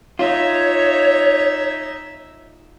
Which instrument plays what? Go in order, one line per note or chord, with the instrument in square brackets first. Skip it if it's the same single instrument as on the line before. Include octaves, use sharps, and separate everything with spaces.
[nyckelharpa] D#4 E5 [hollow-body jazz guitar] F4 [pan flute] C#5